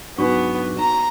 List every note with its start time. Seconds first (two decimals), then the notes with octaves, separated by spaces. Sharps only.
0.18 G#2 F#3 B3 D4 D#4 F#4 C#6
0.79 A#5